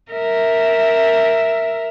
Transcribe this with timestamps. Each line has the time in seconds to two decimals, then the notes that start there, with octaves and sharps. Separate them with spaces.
0.12 A#4 E5